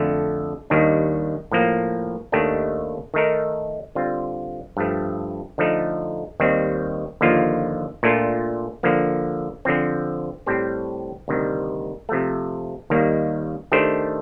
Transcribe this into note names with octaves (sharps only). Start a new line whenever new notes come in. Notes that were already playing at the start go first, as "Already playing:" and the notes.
Already playing: F2 D3 A3
D#2 D#3 G3 D4
A2 F3 A#3
D#2 D#3 A3 D4 G4
D#3 A3 D#4 A#4
D3 G3 C4 F4
G2 F3 A3
D3 F3 A3 D#4
D#2 D#3 G3 C4
D#2 D3 F3 A#3 F4
A#2 A3 D4 F4
D3 F3 A#3
D3 F3 C4
A2 G3 C4 G4 C5
D2 C3 D#3 G3
C3 F3 A3
D#2 D#3 G3 A#3
D#3 A3 D4 G4 C5